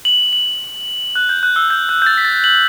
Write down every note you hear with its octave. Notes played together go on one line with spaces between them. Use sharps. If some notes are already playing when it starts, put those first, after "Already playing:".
F#7
F#7
F#6
G6
F#6
E6
G6
F#6
G6
A6
B6
A6
F#7